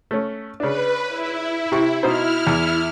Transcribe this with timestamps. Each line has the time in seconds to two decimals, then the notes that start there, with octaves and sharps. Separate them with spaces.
0.11 A3 C#4
0.60 C#3 D4 B4
1.09 E4
1.72 C3 C#6
2.03 B2 D#4 E4 C5 F6
2.47 E2